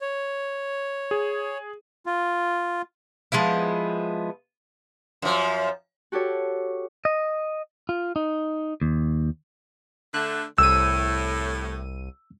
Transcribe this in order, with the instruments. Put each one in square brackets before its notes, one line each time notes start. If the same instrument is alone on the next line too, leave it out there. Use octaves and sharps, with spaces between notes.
[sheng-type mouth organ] C#5
[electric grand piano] G#4
[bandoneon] F4
[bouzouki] F3 G#3 B3 E4
[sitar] F#2 F3
[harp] F#4 G4 A4 C#5
[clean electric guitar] D#5
F4
D#4
D#2
[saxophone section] D3 A3 [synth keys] F#6
[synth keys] C2 D#7 [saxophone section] A2 [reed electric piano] E6